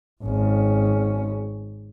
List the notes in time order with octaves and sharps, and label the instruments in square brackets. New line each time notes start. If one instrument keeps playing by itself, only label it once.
[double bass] G#1 C#4